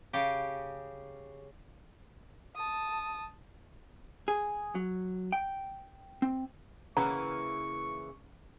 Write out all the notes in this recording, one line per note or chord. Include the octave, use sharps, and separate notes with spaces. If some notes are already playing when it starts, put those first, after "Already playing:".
C#3 G4
A5 D#6
G#4
F#3
G5
C4
C#3 E3 A#3 C#4 B4 F#5 A#5 C#6